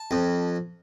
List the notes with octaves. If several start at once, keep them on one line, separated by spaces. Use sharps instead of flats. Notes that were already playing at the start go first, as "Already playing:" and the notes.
Already playing: A5
F2